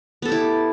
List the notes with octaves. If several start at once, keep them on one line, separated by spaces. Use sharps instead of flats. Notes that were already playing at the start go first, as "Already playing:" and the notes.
B3 E4 G4 A4